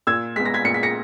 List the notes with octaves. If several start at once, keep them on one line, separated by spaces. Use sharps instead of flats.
A#2 E6 G#6
G#3 B3 B6
A#6
G#6 B6
A#2 C#7
B6
A#6 C#7